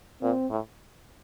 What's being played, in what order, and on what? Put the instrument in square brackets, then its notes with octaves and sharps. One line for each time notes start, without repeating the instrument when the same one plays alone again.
[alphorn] A#2 [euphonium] C4
[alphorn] A2